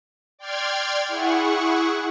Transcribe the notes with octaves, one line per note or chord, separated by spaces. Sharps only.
D5 G5 C6 F6 G#6
E4 G#4 F#5 C#6